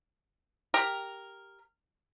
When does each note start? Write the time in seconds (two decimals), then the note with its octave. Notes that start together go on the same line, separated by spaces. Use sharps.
0.74 G4 A#4